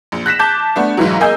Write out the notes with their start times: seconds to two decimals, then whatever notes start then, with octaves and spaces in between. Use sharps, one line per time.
0.12 A#1
0.26 F#6 A#6 B6 E7
0.39 A5 D6 G6
0.76 A3 B3 D4
0.97 B1 G#2 E3 F#3
1.20 A#3 G#4 D#5 G#5 E6 G6